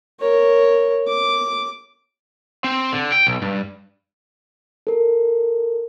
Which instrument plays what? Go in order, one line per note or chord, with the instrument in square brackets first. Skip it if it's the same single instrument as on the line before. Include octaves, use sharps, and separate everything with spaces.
[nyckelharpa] A#4 C#5
D6
[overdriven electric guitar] C4
D3
G5
B1
G2
[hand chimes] A4 A#4